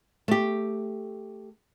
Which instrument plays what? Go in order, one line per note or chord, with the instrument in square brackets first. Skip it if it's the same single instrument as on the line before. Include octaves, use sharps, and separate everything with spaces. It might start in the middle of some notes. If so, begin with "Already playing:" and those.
[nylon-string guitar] A3 G4